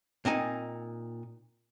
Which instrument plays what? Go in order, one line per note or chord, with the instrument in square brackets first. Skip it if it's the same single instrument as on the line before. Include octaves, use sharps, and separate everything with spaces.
[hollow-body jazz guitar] A#2 C4 D#4 G#5